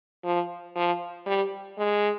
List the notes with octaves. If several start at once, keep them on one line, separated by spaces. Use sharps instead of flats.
F3
F3
G3
G#3